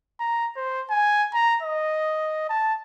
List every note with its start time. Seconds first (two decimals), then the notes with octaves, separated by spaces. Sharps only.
0.20 A#5
0.57 C5
0.90 G#5
1.34 A#5
1.63 D#5
2.50 A5